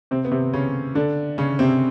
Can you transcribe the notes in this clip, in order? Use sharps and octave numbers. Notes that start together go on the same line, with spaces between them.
C3 C4
B3
C3 C4
C#3 C#4
D3 D4
C#3 C#4
C3 C4